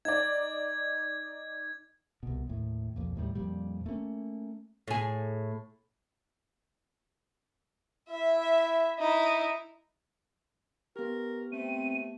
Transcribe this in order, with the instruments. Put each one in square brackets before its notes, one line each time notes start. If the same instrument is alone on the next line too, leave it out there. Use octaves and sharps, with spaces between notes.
[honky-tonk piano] D#4 D5 [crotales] G#6
[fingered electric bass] C2 B2
D#2 A2
B1 F2 A#2
D#2 A2 C#3 G3
F2 A#2 G3
A3 A#3 C4 C#4
[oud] A2 G#4
[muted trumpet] E4 [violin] E5
[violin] D#4 E4
[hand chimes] B3 G4 [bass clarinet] A#4
[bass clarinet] A3 [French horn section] C4 [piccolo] D#7